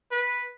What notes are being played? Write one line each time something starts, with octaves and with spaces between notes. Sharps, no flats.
B4